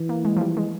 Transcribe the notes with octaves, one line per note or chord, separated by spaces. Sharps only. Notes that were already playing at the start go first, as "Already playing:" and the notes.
Already playing: E3
A#3
G#3
F3
G3
G#3